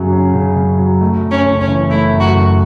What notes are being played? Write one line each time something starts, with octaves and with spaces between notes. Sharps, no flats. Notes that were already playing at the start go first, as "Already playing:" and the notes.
Already playing: F#2 C#3 F#3 C#4
C#4
C#3
F#2
F#3
A3
F#2
C#4
F#1
C#4
E3
A3 E4
F#2
F#4
F#1